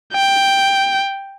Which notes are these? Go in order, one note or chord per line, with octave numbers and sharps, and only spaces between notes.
G5